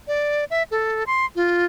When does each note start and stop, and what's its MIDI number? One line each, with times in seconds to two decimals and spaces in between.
0.08 0.45 74
0.51 0.63 76
0.71 1.04 69
1.07 1.25 84
1.36 1.65 65